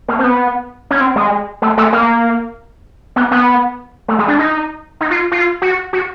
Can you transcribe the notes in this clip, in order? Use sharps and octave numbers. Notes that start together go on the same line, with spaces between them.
A#3
C4
B3
C#4
C4
G#3
A3
A3
A#3
B3
B3
A3
G#3
D4
D#4
D#4
F4
F4
F#4
F#4